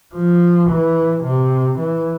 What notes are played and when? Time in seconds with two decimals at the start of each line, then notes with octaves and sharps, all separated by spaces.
0.14 F3
0.69 E3
1.23 C3
1.78 E3